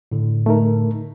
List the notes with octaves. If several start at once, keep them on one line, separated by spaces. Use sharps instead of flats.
A2 D3
A3 D#4 A#4